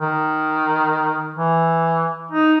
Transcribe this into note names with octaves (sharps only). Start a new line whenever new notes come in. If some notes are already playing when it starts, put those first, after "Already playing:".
D#3
E3
D#4